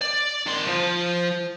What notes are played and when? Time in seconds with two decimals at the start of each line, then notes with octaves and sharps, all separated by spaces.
0.02 D5
0.47 D#3 C6
0.67 F3